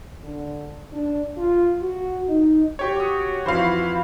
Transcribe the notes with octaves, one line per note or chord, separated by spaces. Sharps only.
D3
D4
F4
F#4
D#4
F#4 G4 C#5
F#4 D6 D#6
F2 E3 C5 F5 B5